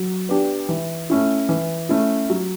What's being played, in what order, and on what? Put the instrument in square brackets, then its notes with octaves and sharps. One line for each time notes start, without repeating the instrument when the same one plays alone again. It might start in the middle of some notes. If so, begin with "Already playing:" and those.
Already playing: [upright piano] F#3
B3 D4 G4
E3
A3 C#4 E4
E3
A3 C#4 E4
F#3